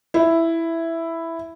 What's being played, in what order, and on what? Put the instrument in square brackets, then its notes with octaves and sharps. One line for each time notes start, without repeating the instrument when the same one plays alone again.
[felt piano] E4